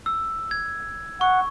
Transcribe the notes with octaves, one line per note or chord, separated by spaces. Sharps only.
E6
G#6
F#5 C#6